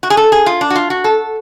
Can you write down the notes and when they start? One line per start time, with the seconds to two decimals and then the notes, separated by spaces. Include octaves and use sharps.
0.03 F#4
0.10 G#4
0.17 A4
0.32 G#4
0.46 F4
0.61 D4
0.70 F#4
0.76 F4
0.90 F#4
1.04 A4